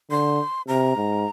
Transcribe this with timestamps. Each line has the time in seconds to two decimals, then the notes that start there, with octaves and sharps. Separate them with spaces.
0.11 D3 C6
0.68 C3 A#5
0.96 G#2